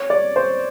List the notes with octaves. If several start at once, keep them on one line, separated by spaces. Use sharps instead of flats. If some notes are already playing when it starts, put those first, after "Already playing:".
Already playing: C#5
D5
C5